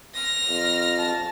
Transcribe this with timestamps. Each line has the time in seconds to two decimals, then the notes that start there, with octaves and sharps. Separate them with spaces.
0.15 F6 A#6
0.49 F2
0.98 A5